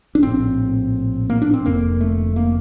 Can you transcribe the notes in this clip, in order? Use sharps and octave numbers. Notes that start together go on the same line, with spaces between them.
D4
A#1 A2 C4
A#3
D4
C4
F1 F2 D3 A#3
A3
A#3